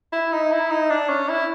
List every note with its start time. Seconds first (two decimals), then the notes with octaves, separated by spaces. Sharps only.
0.12 E4
0.32 D#4
0.51 E4
0.70 D#4
0.90 D4
1.09 C#4
1.28 E4